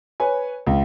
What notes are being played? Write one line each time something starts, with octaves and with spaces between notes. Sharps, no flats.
B4 C#5 G#5
C#2